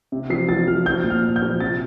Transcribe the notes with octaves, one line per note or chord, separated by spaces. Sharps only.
C3
F3 C7
F3 A6
F3 F6
F3 G6
A#2
F6
A#2
G6
F3
C3 A6